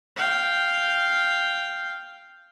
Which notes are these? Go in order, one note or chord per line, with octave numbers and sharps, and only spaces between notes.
F5 G5